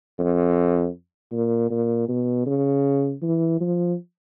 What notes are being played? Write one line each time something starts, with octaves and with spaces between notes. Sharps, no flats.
F2
A#2
A#2
B2
C#3
E3
F3